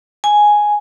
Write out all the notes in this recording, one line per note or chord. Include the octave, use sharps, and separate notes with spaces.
G#5